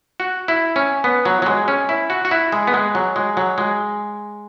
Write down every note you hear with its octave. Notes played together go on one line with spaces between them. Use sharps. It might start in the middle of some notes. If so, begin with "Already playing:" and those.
F#4
E4
C#4
B3
F#3
F#3
G#3
C#4
E4
F#4
F#4
E4
G#3
B3
G#3
F#3
G#3
F#3
G#3